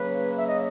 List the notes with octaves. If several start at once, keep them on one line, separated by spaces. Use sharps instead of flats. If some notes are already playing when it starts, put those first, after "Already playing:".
Already playing: C#3 F#3 A#3 B4
E5
D#5